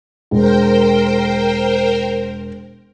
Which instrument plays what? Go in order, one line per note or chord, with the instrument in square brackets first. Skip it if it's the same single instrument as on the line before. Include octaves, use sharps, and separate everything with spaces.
[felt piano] E1 [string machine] A#4 C5 G5